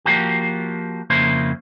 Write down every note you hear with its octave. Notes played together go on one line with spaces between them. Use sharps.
F3 A#3 F#4 G4
F2 C#3 A#3 E4 C5